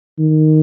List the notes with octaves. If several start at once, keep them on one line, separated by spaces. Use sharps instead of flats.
D#3